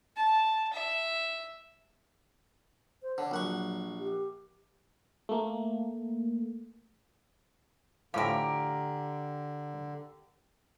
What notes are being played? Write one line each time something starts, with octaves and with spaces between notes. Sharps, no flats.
A5
E5
C5
D3 C#5
A#1 F#3 F#5 C#6
G4
A3 A#3
A2 D3 F3 G4 A#4 F5 G#5